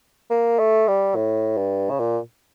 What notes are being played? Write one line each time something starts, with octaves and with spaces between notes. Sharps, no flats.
A#3
A3
G3
A2
G2
C#3
A#2